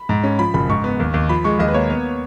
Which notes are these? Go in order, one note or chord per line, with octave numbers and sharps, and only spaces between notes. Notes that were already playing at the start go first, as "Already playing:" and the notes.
Already playing: B5
G#2
C#4
F3 B5
F#1 B5
G#2 C#6
B3
D#2
D#2
F3 B5
G#3 C#6
D#2 D#5
B4
A#3 C#5
B3